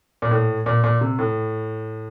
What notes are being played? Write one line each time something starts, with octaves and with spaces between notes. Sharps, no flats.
A#2
A2
A#2
A#2
C3
A2